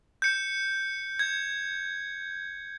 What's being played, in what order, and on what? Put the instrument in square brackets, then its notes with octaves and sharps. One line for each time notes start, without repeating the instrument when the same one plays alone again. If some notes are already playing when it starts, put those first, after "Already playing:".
[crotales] G6 C#7
G#6